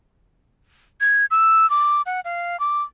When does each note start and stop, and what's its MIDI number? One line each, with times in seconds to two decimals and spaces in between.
1.01 1.25 92
1.31 1.69 88
1.70 2.02 86
2.06 2.20 78
2.25 2.59 77
2.60 2.82 86